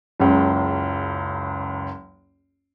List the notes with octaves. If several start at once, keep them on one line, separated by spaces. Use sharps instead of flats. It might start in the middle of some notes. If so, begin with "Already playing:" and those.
F#1 C#2